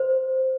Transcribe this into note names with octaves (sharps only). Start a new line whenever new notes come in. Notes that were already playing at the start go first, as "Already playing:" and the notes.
Already playing: C5